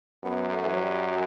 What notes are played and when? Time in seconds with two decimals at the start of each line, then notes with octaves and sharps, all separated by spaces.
0.24 F#2 B3
0.52 A3
0.65 E3
0.73 F#3
0.83 G3
1.11 F#3